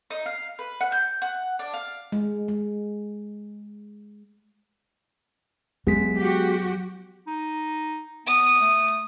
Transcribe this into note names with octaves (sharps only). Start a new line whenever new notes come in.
D#4
F5
B4
F#5
G6
F#5
D4
F5
G#3
G#3
F#3 G#3 B3 G#4 B6
F#4 G4
D#4
B3 D#6
A3